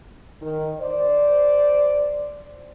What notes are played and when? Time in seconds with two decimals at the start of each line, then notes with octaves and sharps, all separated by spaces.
0.41 D#3
0.80 C5 D5